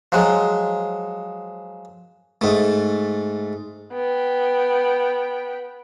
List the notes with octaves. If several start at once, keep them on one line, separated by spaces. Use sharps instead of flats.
F3 F#3 G#3
G#2 A3
B3 G5